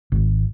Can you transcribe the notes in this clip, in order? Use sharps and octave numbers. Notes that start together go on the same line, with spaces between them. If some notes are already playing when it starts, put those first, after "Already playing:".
G#1